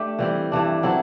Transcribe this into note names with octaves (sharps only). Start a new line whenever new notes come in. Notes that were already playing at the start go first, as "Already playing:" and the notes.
Already playing: A3 D4 G4
E3 G3 C4
G2 E3 G3 D4
F#3 C4 E4 A4